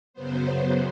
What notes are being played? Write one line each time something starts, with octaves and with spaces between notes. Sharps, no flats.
F#2 C#3 F#3 B3 C5